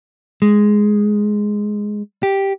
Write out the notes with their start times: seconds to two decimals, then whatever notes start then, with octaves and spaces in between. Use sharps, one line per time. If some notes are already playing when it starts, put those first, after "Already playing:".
0.42 G#3
2.23 G4